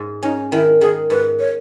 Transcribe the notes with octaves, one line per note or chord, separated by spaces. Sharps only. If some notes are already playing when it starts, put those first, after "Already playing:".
Already playing: G#2
C#4 D#4
D#3 E4
D#3 G#4
G#2 B4
C#5